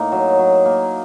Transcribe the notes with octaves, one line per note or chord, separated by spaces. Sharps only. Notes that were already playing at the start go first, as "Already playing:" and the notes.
Already playing: A2 A#3 D#4
F#3
F#3
A#3